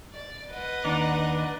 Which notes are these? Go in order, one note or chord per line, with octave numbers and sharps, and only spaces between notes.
D5
B4 D#5 F#5
D#2 D4 D#4